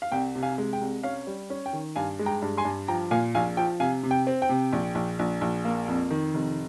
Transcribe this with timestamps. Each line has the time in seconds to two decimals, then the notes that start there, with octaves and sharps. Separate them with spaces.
0.02 F5
0.12 C2 G5
0.35 C3
0.43 F5 G#5
0.58 G#3
0.73 G5
0.81 C2
1.03 C#4 F5
1.27 G3
1.50 C#4
1.66 G5
1.73 D#3
1.96 G2 F5 G#5
2.19 G#3
2.26 G5 A#5
2.42 G2
2.58 G#5 C6
2.65 G2
2.88 F3 G5 A#5
3.11 A#2 F5 G#5
3.35 A#1 F5 G#5
3.57 F3 G5
3.80 C3 F5 G#5
4.03 C3
4.11 G5
4.27 C4
4.42 G5
4.49 C3
4.73 A#1
4.95 A#1
5.19 A#1
5.41 A#1
5.65 A#3
5.88 F2
6.10 D#3
6.34 F1